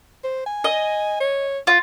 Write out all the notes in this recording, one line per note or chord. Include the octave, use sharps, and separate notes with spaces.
C5
G#5
D#5
C#5
F4